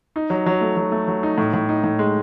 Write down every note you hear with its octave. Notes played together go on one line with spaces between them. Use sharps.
D#4
F#3
F#3
A3
F#3
A3
F#3
D#4
A2
A2
D#4
A2
G#3